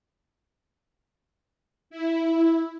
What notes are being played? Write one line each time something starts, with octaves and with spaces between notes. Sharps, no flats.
E4